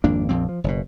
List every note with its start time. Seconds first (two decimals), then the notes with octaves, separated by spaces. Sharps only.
0.04 G#1 F2 A#3 D4
0.29 A#1 F2 C4
0.49 F3
0.64 F#1 B2